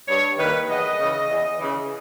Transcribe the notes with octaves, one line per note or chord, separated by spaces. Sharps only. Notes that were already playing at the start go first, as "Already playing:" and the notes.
G2 C#5
D#3 G3 A#3 B4
E2 D#5
C#3 E3
E2
C#3 E3